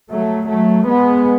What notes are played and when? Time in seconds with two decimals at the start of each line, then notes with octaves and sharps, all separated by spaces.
0.11 F#3 A3
0.49 F#3 A3
0.88 G#3 B3